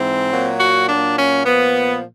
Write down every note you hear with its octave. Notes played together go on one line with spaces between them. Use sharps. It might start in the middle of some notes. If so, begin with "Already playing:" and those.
Already playing: G#2 E3 C4
A#2 F#3
F#4
A#2 F#3 D4
C#4
A#2 F3 B3